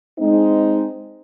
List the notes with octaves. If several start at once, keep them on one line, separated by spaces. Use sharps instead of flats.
G#3 C4 D#4